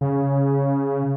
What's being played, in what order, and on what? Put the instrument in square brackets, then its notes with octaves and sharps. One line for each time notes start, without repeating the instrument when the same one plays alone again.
[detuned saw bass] C#3